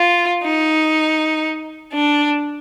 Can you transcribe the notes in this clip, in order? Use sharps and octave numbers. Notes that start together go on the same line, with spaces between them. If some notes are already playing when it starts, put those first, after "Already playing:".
Already playing: F4
D#4
D4